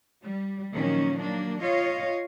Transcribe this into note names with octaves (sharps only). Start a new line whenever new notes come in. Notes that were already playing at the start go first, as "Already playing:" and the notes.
G3
A#2 D#3 F3 F#3 A#3 C#4
F#3 A#3 D4
F4 C#5 D#5 F5